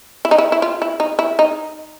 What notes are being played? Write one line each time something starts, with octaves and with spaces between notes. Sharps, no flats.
E4
D#4
E4
E4
F4
E4
D#4
E4
D#4